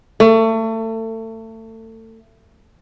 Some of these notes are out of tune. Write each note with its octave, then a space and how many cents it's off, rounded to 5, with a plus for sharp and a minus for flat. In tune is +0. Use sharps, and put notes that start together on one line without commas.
A3 +30